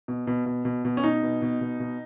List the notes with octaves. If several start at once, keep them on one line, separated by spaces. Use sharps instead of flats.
B2
B2
B2
B2
B2
C#4
B2 D#4
B2
B2
B2
B2